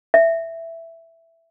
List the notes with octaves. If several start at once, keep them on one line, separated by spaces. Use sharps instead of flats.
E5